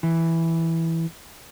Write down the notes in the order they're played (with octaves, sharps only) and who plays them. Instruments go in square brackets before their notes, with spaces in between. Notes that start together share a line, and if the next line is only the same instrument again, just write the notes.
[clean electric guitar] E3